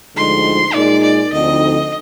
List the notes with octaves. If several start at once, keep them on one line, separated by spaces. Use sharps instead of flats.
D2 D3 F3 G#3 D#4 C6
A#2 G#3 D#4 D5
D5
D2 D3 F3 C4 D#4 D#5